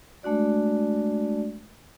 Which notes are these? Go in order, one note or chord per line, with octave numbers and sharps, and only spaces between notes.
G#3 A3 D4 F#4 D5